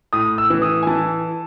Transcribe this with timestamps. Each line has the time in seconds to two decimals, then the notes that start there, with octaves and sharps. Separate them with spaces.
0.13 A2 D#6
0.38 E6
0.50 E3
0.62 D#6
0.83 G#5
0.87 E3 A5